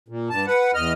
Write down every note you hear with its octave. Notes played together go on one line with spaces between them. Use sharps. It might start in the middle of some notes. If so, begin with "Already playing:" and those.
A#2
G2 A5
B4 F#5
E2 D#5 F6